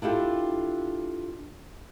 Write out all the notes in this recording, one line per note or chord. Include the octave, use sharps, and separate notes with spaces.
D4 E4 F4 G4 A4